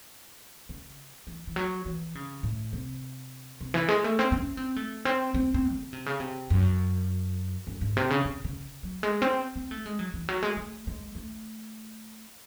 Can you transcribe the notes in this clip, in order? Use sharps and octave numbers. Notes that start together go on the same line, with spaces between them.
C#3
E3
E3
F#3
E3
C#3
A2
C3
C3
E3
G#3
A3
C4
C4
C#4
C4
A3
C4
C4
C4
C#3
C3
C#3
C3
F#2
F#2
G#2
C3
C#3
C#3
C#3
F#3
G#3
C4
C4
A3
G#3
F#3
E3
F#3
G#3
A3
G#3
A3